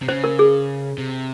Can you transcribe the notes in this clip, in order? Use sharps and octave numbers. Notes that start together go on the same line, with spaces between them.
C3
C#3 C5
A#4
G#4
C3